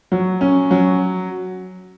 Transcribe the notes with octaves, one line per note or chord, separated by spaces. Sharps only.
F#3
C#4
F#3